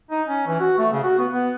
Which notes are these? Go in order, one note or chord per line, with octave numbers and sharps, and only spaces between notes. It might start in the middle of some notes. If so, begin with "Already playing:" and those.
D#4
C#4
E3
F#4
A3
C#3
F#4
B3
B3